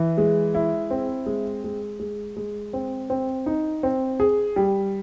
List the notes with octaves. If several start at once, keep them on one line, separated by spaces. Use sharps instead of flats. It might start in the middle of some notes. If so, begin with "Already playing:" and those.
Already playing: E3
G#3
E4
C4
G#3
G#3
G#3
G#3
C4
C4
D#4
C4
G#4
G3